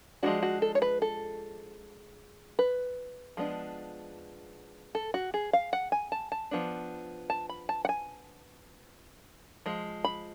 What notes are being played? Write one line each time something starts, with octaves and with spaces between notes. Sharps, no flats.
F3 G#3 B3 D4 F#4
F#4
A4
C#5
B4
A4
B4
F3 G#3 B3 D4
A4
F#4
G#4
F5
F#5
G#5
A5
A5
F3 B3 D4
A5
B5
A5
F#5
G#5
F3 G#3
B5